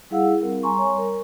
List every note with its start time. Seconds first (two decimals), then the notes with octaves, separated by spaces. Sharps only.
0.10 G3 E4 G#4 F5 F#5 E6
0.42 C4 A#4
0.63 G3 G#5 A#5 C6 C#6
0.78 C#5
0.98 A#4